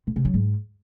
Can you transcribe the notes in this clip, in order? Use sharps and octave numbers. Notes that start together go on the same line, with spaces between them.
A#2
C3
F#3
G#2